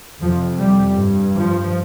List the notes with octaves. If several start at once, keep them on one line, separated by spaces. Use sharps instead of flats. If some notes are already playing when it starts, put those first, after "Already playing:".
F2 C3 F3
G3
G2
F3